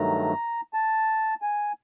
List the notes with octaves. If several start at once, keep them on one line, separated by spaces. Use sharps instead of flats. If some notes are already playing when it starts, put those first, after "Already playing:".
Already playing: G2 D#3 F#3 A3 A#5
A5
G#5